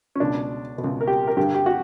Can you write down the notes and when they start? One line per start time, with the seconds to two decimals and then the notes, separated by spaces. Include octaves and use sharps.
0.15 C#4
0.20 C#2 B2 D4
0.78 B2
0.84 C#2
1.01 A#4
1.07 G4
1.28 A#4
1.37 G2 D3 G4
1.55 G4
1.66 F#4